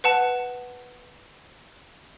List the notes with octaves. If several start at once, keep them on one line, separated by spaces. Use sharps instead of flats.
B4 F#5 A5